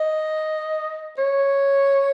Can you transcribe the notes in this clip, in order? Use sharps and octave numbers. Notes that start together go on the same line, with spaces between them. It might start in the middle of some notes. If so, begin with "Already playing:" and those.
Already playing: D#5
C#5